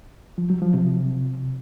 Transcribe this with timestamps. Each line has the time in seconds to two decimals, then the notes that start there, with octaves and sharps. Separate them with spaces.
0.38 F3
0.50 F#3
0.62 F3
0.74 C3